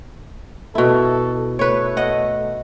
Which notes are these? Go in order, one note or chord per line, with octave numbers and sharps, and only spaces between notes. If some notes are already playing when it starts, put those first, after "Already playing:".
B2 E4 A4
A3 B4 C#5
D#5 F#5